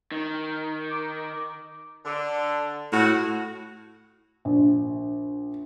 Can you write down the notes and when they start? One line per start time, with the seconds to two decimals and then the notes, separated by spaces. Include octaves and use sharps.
0.11 D#3
0.91 D#4 D6
2.04 D3
2.93 A2 F#4
4.45 A#1